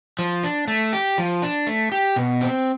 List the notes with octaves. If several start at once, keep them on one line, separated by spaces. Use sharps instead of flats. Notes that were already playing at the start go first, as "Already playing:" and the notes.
F3
D4
A3
G4
F3
D4
A3
G4
B2
C4